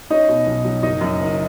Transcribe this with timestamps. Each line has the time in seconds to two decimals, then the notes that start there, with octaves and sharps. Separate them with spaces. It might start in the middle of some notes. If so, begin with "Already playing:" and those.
0.10 C#4 D#4 D#5
0.29 B2
0.47 B1
0.65 F#3
0.83 F#1 D#4 D#5
1.01 F#2
1.20 F#1